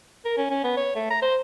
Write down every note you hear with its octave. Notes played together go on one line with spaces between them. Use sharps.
A#4
C#4
C#4
B3
C#5
A3
A#5
C5